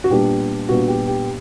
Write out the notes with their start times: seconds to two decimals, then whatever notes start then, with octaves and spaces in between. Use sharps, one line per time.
0.04 F#4
0.10 A#2 G3 B3 D4 G4
0.69 A#2 G3 B3 D4 F#4
0.88 G4
1.07 G4